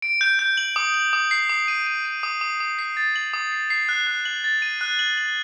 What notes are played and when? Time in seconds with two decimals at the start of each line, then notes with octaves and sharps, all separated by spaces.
0.02 D7
0.21 G6
0.39 G6
0.57 F#7
0.76 D#6
0.94 F#7
1.13 D#6
1.31 C7
1.49 D#6
1.68 D#7
1.87 D#7
2.05 D#7
2.23 D#6
2.41 D#6
2.60 D#6
2.79 C7
2.97 A6
3.16 F#7
3.33 D#6
3.52 C7
3.70 C7
3.89 F#6
4.07 F#6
4.25 F#7
4.44 A6
4.62 D#7
4.81 F#6
4.99 F#7
5.17 F#7